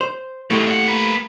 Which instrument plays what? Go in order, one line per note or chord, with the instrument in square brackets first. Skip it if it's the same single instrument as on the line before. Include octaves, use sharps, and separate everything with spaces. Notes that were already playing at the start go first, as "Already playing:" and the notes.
[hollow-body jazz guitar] C5
[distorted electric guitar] B2 G#3 [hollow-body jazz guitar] A3 E4 G4
[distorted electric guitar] A#2 F#5
A#3 B4